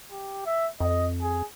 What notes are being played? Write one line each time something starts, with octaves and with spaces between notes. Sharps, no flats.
G4
E5
F2 D#5
G#4